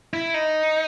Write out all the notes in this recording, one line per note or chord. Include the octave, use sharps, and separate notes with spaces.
E4
D#4